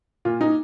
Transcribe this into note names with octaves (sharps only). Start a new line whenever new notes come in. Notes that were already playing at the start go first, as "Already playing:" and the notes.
A#2 F4
D#4